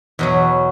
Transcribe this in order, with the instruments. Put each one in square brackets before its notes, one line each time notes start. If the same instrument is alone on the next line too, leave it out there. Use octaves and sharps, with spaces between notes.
[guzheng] E2 B2 F#3